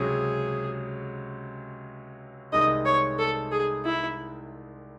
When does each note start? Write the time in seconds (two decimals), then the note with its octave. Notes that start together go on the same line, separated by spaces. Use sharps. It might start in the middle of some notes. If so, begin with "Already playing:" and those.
Already playing: C#2 C3 F#3 C#4 G#4
2.52 C2 C3 D#3 G#3 D#4 D#5
2.85 C#5
3.18 A4
3.51 G#4
3.85 E4